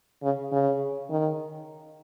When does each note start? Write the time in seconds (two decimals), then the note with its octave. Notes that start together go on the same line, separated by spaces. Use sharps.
0.23 C#3
0.52 C#3
1.10 D#3